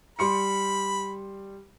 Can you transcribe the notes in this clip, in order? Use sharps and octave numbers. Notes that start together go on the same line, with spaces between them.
G3 B5 C6 C#7